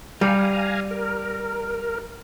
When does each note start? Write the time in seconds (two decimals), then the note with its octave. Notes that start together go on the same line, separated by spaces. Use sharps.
0.21 G3 F5 G#5 A#5
0.91 A#4